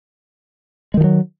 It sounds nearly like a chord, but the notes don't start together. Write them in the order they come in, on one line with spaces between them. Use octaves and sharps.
G#3 D#3 F3 F#3